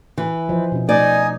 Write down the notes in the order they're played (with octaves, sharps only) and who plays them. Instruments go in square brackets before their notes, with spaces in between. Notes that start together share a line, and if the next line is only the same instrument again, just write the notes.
[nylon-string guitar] E3
[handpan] F3 C5 D#5
B2 C#4
[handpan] A3 [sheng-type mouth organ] D#4 G#5 [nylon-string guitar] D5